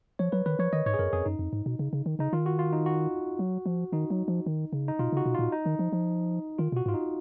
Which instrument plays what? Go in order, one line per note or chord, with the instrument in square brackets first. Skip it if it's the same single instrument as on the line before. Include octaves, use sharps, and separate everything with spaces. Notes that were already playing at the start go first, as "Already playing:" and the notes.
[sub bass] F3 [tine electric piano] C#5
[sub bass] F#3 [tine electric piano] B4
[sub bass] D#3 [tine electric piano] B4
[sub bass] F3 [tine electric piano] C#5
[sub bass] D#3 [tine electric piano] D#5
[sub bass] G#2 [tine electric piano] C#5
[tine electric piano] G#4
[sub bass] F#2 [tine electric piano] A#4
[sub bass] F2 [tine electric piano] G#4
[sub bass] F#2 [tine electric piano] D#4
[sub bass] F2
G#2
B2
C#3
C#3
D#3
[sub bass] C#3 [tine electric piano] D#4
[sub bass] D#3 [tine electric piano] F4
[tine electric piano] F#4
F4
D#4
F#4
[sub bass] F#3
F3
[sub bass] D#3 [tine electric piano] D#4
[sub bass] F#3
F3
D#3
C#3
[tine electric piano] D#4
[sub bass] B2 [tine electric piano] F4
[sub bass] C#3
[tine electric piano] F#4
[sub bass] B2
[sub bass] A#2 [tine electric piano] F4
[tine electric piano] D#4
[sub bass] D#3
F3
F3
[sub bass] D#3 [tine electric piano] F4
[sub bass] B2 [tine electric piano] F#4
[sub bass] G#2 [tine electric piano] F4
[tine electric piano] D#4